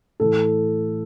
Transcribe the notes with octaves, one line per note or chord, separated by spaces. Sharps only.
A2 E3 A4